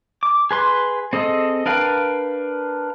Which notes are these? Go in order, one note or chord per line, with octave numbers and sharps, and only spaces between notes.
D6
G#4 B4 C6
C4 G#4 A4 D#5
D4 A#4 B4 F5 G5